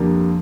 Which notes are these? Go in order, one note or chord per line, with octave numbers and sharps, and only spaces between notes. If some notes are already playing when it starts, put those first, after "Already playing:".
Already playing: F2 D3 G3 A#3